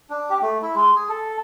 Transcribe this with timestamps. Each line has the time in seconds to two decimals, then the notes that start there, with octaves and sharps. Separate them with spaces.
0.10 D4
0.30 G4
0.42 A3
0.62 E4
0.75 G#3
0.96 G#4
1.09 A4